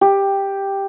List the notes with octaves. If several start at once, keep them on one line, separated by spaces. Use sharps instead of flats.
G4